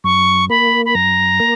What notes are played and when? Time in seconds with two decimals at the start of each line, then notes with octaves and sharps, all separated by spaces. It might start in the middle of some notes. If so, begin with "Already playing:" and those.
0.04 F#2 C#6
0.50 A#3 B5
0.85 B5
0.95 F#2 A#5
1.40 A#3